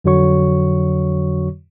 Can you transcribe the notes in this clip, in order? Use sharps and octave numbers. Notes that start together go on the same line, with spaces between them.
F2 D3 F#3 F#4 C#5 C#6